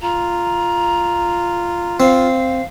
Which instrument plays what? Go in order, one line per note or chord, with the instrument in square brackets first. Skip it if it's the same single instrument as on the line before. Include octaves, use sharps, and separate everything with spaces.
[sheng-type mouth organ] F4 [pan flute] A#5
[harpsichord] C4 [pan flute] F5